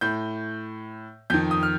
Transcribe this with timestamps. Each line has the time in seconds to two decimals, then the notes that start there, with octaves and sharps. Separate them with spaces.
0.01 A2 G6
1.30 F2 D#3 G6
1.51 D#6
1.63 F6